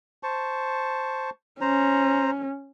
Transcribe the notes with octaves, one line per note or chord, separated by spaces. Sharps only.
C5 A5 C#6
C#4 C5 A#5